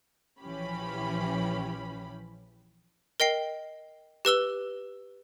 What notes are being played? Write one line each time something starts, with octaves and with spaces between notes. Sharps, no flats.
A#1 E3 F3 C#4 G4 B5
A#4 D#5 G5 C7
G4 B4 E6 G7